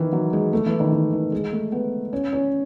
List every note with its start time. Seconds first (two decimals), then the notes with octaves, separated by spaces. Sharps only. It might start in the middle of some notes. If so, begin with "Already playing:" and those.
Already playing: D#3 E3
0.12 F#3
0.33 G#3
0.53 A3
0.66 E3
0.80 D#3
0.92 E3
1.13 E3
1.32 G#3
1.52 A3
1.72 B3
2.13 C#4
2.33 C#4